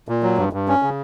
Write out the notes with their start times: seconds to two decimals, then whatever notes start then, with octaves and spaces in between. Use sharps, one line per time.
0.09 A#2
0.23 F#3
0.38 G2
0.53 G2
0.68 C#4
0.83 C#3